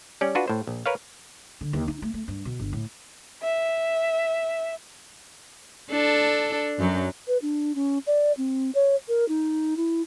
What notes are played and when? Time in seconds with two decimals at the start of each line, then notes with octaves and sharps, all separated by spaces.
0.21 G3 C#4 D5
0.35 D4 F4 F#4 B4
0.48 A2 C5
0.67 A#1
0.86 A#4 B4 C#5 F5
1.61 D3
1.73 D#2
1.88 D#4
2.02 A3
2.14 A3
2.28 G2
2.45 B2
2.60 G1
2.73 A2
3.43 E5
5.91 D4 A4
6.79 F#2 F#3
7.28 B4
7.42 D4
7.75 C#4
8.07 D5
8.37 C4
8.75 C#5
9.08 A#4
9.28 D#4
9.77 E4